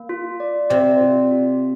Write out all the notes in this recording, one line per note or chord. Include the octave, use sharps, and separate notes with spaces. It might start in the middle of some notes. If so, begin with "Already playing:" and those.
Already playing: A#3
F4
D5
C3 D5
F4
F4